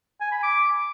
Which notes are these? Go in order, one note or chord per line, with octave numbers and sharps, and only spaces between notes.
G#5
B5
D6